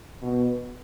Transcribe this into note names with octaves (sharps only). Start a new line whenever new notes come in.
B2